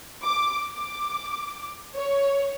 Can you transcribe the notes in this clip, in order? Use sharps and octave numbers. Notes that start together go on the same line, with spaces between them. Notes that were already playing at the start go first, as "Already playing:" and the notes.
D6
D6
C#5